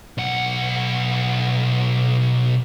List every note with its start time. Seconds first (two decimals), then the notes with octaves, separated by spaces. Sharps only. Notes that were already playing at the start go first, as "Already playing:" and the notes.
0.18 B1 F#5